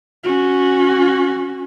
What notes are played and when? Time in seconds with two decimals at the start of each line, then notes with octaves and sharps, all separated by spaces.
0.24 C#4 F#4